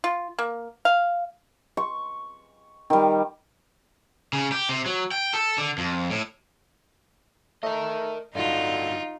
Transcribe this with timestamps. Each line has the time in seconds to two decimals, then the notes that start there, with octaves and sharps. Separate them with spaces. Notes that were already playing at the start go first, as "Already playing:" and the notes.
0.04 F4
0.39 A#3
0.85 F5
1.77 C#6
2.90 D#3 G3
4.33 C#3
4.52 G4
4.69 C3
4.86 F#3
5.11 G5
5.33 A4
5.58 D3
5.78 F2
6.11 A2
7.63 A3 A#4 D#5
8.35 G2 D3 F#3 D#4 F4